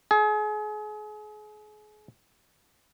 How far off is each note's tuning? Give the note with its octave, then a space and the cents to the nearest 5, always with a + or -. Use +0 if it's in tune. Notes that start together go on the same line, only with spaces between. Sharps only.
G#4 +35